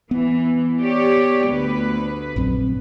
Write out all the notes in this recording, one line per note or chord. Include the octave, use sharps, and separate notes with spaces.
E3 B3
G4 C#5 D5
D2 B4
A#1 F#2 C4